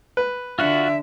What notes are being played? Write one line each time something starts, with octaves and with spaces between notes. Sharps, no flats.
B4
D3 F4 F#4 E5 F#5